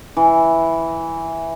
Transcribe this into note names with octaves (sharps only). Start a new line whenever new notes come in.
E3